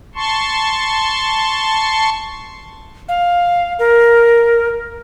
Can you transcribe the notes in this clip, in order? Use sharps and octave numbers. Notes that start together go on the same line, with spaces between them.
A5 C6 C#6
F5
A#4